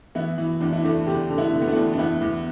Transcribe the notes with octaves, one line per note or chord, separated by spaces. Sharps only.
E3 B3 E4
E3
E2 D4
E4
E2 A3 D4
D3 D4 G4
D3
B3 E4
D3
B3
A3 D4
E2
D4
E2 B3 E4
E2